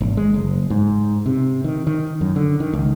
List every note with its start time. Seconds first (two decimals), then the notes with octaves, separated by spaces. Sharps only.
0.01 G#1
0.17 G#3
0.34 F#1
0.70 G#2
1.26 C3
1.64 D#3
1.87 D#3
2.21 F#2
2.36 D3
2.60 D#3
2.73 C#2